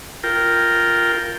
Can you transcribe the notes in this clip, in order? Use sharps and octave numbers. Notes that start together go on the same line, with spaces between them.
F4 A#4 G5